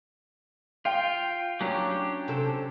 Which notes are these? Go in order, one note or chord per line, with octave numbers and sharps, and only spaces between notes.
F4 F5 G5
F#3 C#4 D4 G4
C3 A4